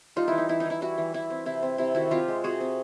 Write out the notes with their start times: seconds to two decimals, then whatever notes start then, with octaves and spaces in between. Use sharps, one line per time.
0.16 G3 D#4 F4
0.28 E3 E4
0.38 D#4
0.49 E3 E4
0.60 D#4
0.66 E3 E4
0.81 G3 E4 F#4
0.98 E3
1.14 E3 E4
1.30 C4
1.46 C3 E4
1.63 C4
1.78 C3 E4
1.94 D#3 E4 F#4
2.11 C4 F4 G4
2.28 G#3
2.44 C3 F#4 G#4
2.61 C4